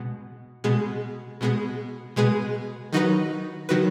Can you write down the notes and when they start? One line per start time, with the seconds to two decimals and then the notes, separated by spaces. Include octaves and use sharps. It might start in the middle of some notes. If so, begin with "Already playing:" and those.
Already playing: B2 G#3 B3
0.64 B2 G#3 B3 G#4
1.41 B2 G#3 B3 G#4
2.16 B2 G#3 B3 G#4
2.93 D#3 F#3 D#4 F#4 B4
3.69 D#3 F#3 D#4 F#4 B4